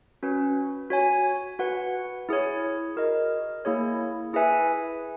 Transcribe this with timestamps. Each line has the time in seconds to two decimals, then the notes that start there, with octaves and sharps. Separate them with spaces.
0.23 C#4 F#4 B4
0.90 F#4 C#5 G#5
1.59 F#4 B4 F#5
2.29 E4 G#4 C#5
2.96 F#4 A#4 D#5
3.65 A#3 E4 G#4 C#5
4.33 E4 G#4 B4 E5 G#5